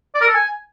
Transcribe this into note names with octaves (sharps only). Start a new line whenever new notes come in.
D5
A#4
A4
G#5